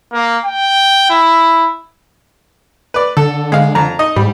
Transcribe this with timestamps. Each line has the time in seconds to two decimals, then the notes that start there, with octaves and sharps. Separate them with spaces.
0.13 A#3
0.45 G5
1.10 E4
2.94 B4 D5
3.17 D3 A4
3.52 G#3 F5
3.75 F2 A#5
3.99 D#4 D#5
4.16 G#2 G3